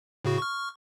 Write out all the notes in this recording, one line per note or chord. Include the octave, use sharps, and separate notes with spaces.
A2 C#3 F#4
C#6 F6